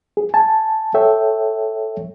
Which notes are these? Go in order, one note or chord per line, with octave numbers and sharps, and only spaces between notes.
G#4
G#5 A5
A4 C#5 E5 G5